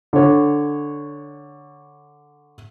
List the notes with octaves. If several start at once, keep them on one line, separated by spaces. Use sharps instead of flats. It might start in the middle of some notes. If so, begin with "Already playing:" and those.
D3 C#5